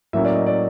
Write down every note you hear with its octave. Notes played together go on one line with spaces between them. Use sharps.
A2 F#3 A#3 C#4 E5
D5
D#5
D5